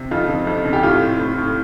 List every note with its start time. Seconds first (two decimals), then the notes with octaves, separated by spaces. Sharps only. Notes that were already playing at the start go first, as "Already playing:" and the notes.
Already playing: C3
0.11 F2 F4
0.29 F2
0.47 F2
0.65 C3
0.73 G4
0.83 A2 F4
1.02 A2
1.19 A2
1.37 A2